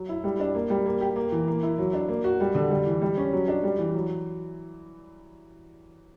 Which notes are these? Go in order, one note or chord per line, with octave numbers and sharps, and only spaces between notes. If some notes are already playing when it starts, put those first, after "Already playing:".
Already playing: F#3
E4
G3
D4
A#3
G3
A#3
G4
A#3
E3
A#3
E4
F#3
D4
A#3
F#4
G3
D3
G3
E3
G3
C#4
F#3
D4
G3
E3
F#3